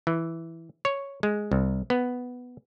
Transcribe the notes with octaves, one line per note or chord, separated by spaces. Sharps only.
E3
C#5
G#3
C2
B3